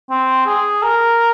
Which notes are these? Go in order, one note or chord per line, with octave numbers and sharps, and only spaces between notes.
C4
G#4
A#4